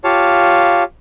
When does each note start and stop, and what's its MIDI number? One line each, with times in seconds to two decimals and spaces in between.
0.04 0.83 65
0.04 0.83 67
0.04 0.83 73
0.04 0.83 77
0.04 0.83 81